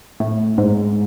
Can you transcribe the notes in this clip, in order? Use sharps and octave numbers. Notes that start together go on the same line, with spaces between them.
A2
G#2